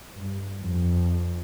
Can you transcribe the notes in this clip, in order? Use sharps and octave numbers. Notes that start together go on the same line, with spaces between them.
G2
F2